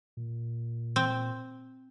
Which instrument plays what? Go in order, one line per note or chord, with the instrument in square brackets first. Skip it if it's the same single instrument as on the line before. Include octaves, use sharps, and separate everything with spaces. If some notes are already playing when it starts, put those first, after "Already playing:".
[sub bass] A#2
[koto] C4